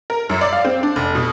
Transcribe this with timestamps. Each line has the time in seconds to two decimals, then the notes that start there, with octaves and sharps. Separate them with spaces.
0.10 A#4
0.29 F#2
0.41 D5
0.53 F5
0.65 C4
0.83 D4
0.96 F1
1.15 B2